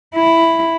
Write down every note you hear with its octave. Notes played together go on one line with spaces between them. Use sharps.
E4